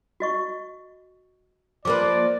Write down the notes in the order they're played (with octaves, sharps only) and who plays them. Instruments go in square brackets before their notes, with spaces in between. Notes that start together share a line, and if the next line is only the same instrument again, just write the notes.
[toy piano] F#4 D#5 C#6
[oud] F3 A#3 B4 [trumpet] D5 [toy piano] D6